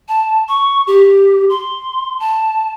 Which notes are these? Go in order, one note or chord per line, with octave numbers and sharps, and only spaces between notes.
A5
C#6
G4
C6
A5